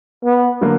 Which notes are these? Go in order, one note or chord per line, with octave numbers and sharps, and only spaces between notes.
B3
D3 F#3 A#3